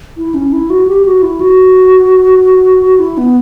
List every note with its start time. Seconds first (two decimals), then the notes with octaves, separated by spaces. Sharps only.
0.17 E4
0.34 C#4
0.53 E4
0.70 F#4
0.87 G4
1.06 F#4
1.22 E4
1.41 F#4
2.99 E4
3.18 B3